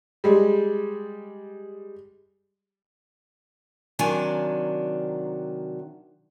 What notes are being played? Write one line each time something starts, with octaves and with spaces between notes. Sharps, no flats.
G3 G#3
C3 D#3 F#3 D4 G#5